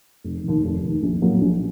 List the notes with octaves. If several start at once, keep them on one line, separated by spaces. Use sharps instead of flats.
F1
D#2 D#3
F1
D#2 D#3
A#1
A2 F#3 A#3
A#1